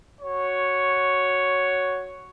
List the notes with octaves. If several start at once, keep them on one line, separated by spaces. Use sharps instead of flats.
F#4 C#5